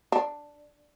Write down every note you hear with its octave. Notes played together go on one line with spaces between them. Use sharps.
D4